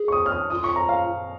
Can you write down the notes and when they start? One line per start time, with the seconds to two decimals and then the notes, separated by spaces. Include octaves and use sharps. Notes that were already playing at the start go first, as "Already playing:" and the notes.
Already playing: G#4
0.08 C#6
0.12 D#6
0.26 F6
0.32 D#6
0.50 F4 D#6
0.64 C#6
0.76 A#5
0.89 F5